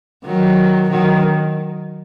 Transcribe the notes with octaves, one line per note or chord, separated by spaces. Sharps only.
D#3 F#3
D#3 F#3